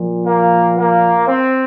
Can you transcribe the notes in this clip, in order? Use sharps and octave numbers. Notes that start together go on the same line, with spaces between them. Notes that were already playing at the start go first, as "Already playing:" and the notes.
Already playing: A#2 F3
A#3
A#3
C4